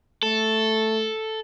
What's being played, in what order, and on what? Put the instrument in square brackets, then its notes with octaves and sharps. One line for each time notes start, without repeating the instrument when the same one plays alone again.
[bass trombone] A3 [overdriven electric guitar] A4